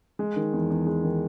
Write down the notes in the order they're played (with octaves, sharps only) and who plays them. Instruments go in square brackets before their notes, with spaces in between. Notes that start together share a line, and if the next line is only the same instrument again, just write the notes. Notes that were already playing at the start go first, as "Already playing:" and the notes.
[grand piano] G#3
D#3
E2
E2
G#3
D#3